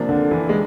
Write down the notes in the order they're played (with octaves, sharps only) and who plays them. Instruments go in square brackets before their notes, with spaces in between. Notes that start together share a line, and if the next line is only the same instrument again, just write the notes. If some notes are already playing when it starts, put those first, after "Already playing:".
Already playing: [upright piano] C3 F3 A#3 D4
[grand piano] D3
E3
G#3